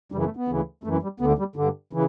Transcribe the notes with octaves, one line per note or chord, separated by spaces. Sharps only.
F#2 C#3 E3 G3
A3
B3
D2 C#3 E3
F#2 E3 A3
G3
D2 D3 B3
G3
G2 D3
C#3 E3